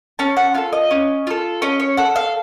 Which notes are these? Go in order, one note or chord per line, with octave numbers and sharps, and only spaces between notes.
C#4 A5
F#5
F4 A4 F5
D#5
C#4
F4 A4
C#4 D#5
C#5
A4 F#5
F5